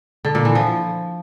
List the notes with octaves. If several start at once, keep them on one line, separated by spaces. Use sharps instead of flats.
D3
A#2
E3
F3